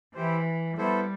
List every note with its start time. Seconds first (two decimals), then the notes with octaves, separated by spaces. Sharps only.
0.14 E3 E4 G4 C5
0.78 G3 B3 E4 A4 C5